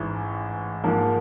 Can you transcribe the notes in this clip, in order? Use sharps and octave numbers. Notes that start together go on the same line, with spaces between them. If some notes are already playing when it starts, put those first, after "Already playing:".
Already playing: A1 G#2 E3
G#2 F3 A#3